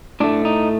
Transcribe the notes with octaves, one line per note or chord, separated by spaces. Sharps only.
A2 A3 D4
D#4